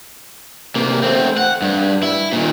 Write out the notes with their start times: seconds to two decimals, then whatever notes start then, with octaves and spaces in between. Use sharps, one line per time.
0.76 C3 A#3
1.03 A3 C4
1.37 F#5
1.62 G2
2.03 E4
2.33 A#2 D#3